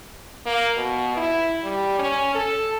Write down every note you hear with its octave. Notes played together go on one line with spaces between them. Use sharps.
A#3
B2
E4
G3
C#4
A4